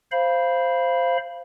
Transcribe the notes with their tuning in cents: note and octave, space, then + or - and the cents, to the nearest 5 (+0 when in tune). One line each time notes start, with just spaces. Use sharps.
C5 +0 F5 -15 B5 -15